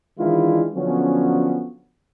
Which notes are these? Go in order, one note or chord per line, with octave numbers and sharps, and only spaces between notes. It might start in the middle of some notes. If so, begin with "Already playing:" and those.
D#3 E3 G#3 D4 E4 F4
D3 F3 F#3 B3 C#4